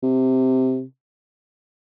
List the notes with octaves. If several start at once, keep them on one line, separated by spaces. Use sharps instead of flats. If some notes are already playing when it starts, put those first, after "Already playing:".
C3